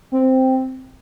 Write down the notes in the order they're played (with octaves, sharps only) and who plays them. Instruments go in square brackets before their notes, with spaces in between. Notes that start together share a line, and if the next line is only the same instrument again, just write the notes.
[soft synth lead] C4